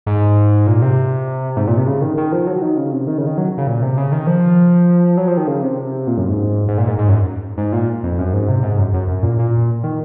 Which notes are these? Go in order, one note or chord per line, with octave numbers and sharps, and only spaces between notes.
G#2
A#2
C3
G#2
A#2
C3
C#3
D#3
D#3
F3
F#3
D#3
C#3
C3
D#3
C#3
D#3
F#3
C#3
A#2
C3
C#3
D#3
F3
F#3
F3
D#3
C#3
C3
A#2
F#2
G#2
G#2
A#2
G#2
G#2
F#2
G#2
A#2
F2
F#2
G#2
C3
G#2
F#2
F#2
F#2
A#2
A#2
D#3